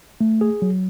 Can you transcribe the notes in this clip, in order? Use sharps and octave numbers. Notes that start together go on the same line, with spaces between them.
A3
G#4
F#3